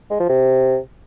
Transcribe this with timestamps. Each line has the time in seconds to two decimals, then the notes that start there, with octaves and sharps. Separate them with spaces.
0.10 G#3
0.20 F3
0.29 C3